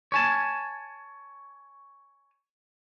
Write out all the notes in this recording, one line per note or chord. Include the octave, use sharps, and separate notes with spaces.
C#5 G#5 A5